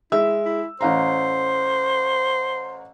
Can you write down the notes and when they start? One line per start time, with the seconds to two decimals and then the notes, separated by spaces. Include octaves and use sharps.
0.12 G#3 E4 E5 E6
0.45 E4
0.81 A1 C5 F5 A#5